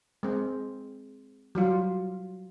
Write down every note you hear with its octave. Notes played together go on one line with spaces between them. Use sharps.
G#3 C4
F#3 G3 F4